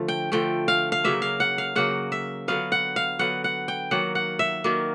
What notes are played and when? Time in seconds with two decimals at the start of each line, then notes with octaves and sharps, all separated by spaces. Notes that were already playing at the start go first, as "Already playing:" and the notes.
Already playing: D3 F3 A3
0.08 G5
0.32 D3 F3 A3 G5
0.68 F5
0.92 F5
1.04 C#3 F#3 A#3 E5
1.22 F5
1.40 F#5
1.58 F5
1.76 C#3 F#3 A#3 F#5
2.12 E5
2.48 D3 F#3 B3 F5
2.72 F#5
2.96 F5
3.19 D3 F#3 B3 F#5
3.44 F#5
3.68 G5
3.91 D#3 F#3 A#3 F#5
4.15 F#5
4.39 E5
4.64 D#3 F#3 A#3